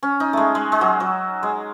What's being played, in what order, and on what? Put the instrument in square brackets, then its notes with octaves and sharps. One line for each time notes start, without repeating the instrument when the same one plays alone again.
[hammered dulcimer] C#4
D#4
G#3 A3
G#3
G#3
F#3
F#3
G#3